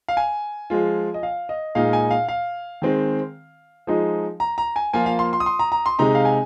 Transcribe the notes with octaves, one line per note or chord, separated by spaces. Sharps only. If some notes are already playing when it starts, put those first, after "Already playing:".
F5
G#5
F3 G#3 F4
D#5
F5
D#5
A#2 G#3 D#4 F5
G#5
F5
F5
D#3 G#3 C4
F3 G#3 D#4
A#5
A#5
G#5
F3 A#3 F4 G#5
F5
C6
C6
D#6
C6
A#5
A#5
C6
C3 G#3 D#4 A#5
F5
G#5